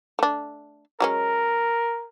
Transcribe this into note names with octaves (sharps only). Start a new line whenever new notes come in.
A3 D4
F#3 G#3 C#4 A#4